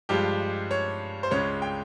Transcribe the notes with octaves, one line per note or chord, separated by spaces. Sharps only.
G2 F3 G#3 G4
C#5
C5
C#2 C#3 G#3 C#5
G5